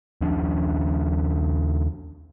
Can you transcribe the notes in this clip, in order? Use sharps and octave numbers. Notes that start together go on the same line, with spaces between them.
D#2 F3 C#4 D4